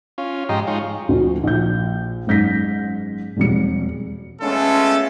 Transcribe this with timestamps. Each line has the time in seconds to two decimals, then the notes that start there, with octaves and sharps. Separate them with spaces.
0.18 C#4 F4
0.49 G#2 F3 G4 D#5 A#5 C6
0.67 G#3 D#4 F4 C#5
1.09 D2 F3
1.43 A#1 G6
2.27 F#1 G#2 G6 A#6 B6
3.37 E1 F2 G3 C#7
4.42 G#3 A3 B3 C#4 F4 A4